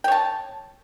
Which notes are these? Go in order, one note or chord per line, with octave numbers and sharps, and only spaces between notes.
C#5 G5 A5